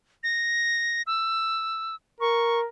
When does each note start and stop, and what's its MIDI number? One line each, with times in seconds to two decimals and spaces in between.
0.23 1.02 94
1.07 1.95 88
2.20 2.65 70
2.20 2.60 85